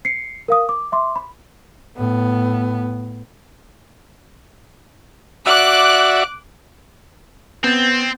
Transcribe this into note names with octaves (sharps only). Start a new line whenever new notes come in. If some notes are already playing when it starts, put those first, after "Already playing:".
C7 C#7
A#4 F5 D#6
D6
E5 C6 D6
B5
A2 B3
F#4 D5 E5 D6 F#6
B3 C4 G6 A6